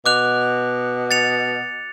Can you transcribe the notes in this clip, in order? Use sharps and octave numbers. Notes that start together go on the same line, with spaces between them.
B2 D6 F#6 F7
A6 C#7 F7